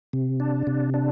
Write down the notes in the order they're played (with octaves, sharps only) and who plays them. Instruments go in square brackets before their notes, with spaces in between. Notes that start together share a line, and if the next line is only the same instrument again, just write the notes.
[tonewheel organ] C3
D4
C3
D4